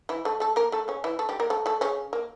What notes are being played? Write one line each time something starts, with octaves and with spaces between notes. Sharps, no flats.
E3 E4
A3 A4
A3 A4
A#3 A#4
A3 A4
C#3 C#4
E3 E4
A3 A4
G3 G4
A#3 A#4
A3 A4
A3 A4
C#3 C#4
A#3